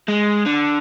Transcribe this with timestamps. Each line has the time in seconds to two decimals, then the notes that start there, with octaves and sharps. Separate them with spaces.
0.08 G#3
0.46 D3